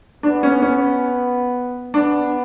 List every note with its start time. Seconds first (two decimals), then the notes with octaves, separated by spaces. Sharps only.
0.23 B3 D4
0.43 C#4
0.62 C#4
1.94 B3 D4